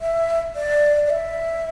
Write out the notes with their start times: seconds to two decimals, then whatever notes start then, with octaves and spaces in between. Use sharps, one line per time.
0.01 E5
0.56 D5
1.06 D5
1.10 E5